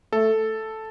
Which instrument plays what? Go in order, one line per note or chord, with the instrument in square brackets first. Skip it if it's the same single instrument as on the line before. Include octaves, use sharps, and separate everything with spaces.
[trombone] A3 [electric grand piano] A4